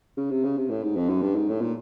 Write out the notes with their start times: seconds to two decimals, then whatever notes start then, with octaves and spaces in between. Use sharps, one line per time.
0.17 C#3
0.31 C3
0.44 C#3
0.57 C3
0.70 A2
0.83 G#2
0.96 F2
1.09 F#2
1.22 G2
1.35 G#2
1.49 A2
1.61 A#2